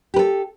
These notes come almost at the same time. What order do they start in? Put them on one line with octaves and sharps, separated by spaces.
G4 B4 A4